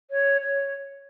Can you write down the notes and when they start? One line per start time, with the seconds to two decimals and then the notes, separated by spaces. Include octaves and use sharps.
0.11 C#5
0.41 C#5